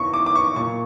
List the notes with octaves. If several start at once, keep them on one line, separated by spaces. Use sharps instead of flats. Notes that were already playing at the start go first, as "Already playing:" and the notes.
Already playing: E2 C#3 E3 C#6
D6
D6
C#6
A#2 C#6